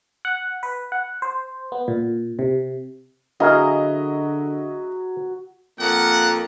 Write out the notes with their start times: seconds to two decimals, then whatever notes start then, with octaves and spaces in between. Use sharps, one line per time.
0.25 F#5
0.63 B4
0.92 F#5
1.22 C5
1.72 B3
1.88 A#2
2.39 C3
3.40 D3 F#3 E4 G#4 A#4 D#5 F5
5.80 F2 A#3 F#5